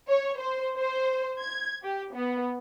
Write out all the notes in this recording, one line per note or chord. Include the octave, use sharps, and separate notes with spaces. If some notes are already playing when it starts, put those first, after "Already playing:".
C#5
C5
C5
G#6
G4
B3